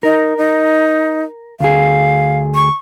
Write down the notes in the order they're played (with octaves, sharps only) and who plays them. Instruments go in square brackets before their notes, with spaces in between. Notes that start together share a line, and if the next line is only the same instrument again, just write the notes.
[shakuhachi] D#4 [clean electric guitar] A#4
[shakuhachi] D#4
[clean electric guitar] D2 G#4 [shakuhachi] F5
[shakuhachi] C#6